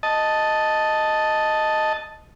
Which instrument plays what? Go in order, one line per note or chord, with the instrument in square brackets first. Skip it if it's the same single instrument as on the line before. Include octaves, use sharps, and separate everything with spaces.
[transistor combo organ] D#5 A5